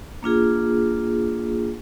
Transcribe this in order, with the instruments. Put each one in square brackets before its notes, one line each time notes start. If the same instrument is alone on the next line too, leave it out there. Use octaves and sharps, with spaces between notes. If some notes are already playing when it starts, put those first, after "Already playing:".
[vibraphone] A#3 D4 F4 G#4